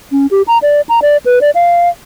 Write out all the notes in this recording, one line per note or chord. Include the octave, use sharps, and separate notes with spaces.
C#4
G4
A#5
D5
A#5
D5
B4
D5
F5